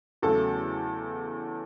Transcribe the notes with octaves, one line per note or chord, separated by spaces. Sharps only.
E2 C#3 F#3 A3 A4